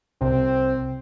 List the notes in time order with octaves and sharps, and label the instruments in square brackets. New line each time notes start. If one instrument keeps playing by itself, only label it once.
[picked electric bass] C2 C3 [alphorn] C4